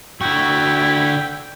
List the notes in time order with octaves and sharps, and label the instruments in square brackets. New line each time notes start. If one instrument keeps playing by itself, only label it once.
[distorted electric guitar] D3 F#4 [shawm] E4 [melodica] G5